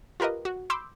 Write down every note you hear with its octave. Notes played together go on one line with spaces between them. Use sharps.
F4 G4 A#4 B4 D#5
F#4
B5 C6 D6 E6 G6